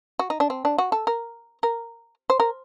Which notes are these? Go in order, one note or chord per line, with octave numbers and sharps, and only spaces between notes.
F#4
D#4
D4
C4
D4
F#4
A4
A#4
A#4
C5
A#4